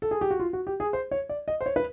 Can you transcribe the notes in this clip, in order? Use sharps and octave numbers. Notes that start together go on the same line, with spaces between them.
A4
G#4
G4
F#4
F4
F#4
G4
G#4
C5
C#5
D5
D#5
C5
C#5
B4